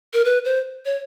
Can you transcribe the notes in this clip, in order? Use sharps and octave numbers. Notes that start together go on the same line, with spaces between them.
A#4
B4
C5
C#5